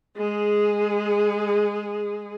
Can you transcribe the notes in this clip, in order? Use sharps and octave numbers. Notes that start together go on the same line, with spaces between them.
G#3 G#4